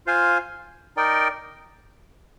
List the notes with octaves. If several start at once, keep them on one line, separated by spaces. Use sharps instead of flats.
F4 C5 F5 G#5
D#4 A#4 D5 G5